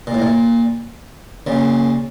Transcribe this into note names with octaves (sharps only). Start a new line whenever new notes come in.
A#2
A2
A#2
A#2 C#3